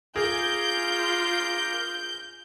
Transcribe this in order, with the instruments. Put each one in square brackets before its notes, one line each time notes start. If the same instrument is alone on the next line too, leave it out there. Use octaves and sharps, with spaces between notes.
[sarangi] F4 [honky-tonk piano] G#4 [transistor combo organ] A#4 D6 F6 [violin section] G6